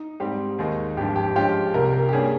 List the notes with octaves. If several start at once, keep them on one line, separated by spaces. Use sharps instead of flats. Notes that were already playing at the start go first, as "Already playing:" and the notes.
Already playing: D#4
G#2 G3 C4 G4
D#2 D#3 G#3 D#4
G#1 G2 F3 G4
G4
G2 F3 G#3 C#4 F4 G4
C2 C3 G3 A#4
A#4
G4
G2 G3 A#3 C#4 G#4